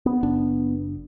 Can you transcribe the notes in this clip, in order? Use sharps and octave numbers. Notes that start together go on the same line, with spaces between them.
B3
F#1 D4